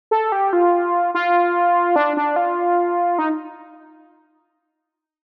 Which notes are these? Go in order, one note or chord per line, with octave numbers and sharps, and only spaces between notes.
A4
G4
F4
F4
D4
D4
F4
D#4